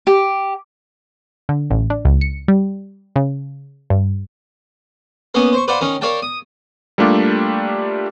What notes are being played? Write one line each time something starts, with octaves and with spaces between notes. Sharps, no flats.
G4
D3
A1
D4
C#2
C#7
G3
C#3
G2
A#3 B3 C#4 D#5
C5 C#6
B4 C5 D5 F5 F#5 C6
D#3 C#4 D#4 A#4
A#4 C#5 D5 F5 G5 A5
D#6
G3 A3 A#3 D4 F4 G4